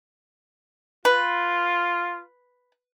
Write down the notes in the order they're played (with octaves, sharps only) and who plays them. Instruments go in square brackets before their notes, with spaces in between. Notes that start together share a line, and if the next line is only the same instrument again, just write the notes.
[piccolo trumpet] F4 [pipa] B4